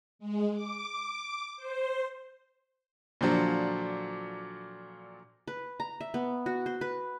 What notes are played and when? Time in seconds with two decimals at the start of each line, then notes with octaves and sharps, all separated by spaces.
0.19 G#3
0.53 D6
1.57 C5
3.21 A#2 D3 F3 F#3 D4
5.48 B4
5.80 A#5
6.00 E5
6.14 B3
6.46 F#4
6.66 C5
6.81 B4